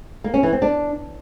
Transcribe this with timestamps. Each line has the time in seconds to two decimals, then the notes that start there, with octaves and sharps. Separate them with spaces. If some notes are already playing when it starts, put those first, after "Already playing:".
0.24 A#3
0.34 C#4
0.43 E3
0.52 C4
0.62 D4